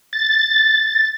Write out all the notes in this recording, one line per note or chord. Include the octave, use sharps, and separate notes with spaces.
A6